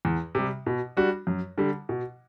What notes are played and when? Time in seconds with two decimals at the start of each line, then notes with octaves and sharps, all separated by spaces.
0.05 E2
0.35 C3 G3
0.66 B2
0.97 G3 D4 F#4
1.27 F#2
1.58 D3 G3
1.89 B2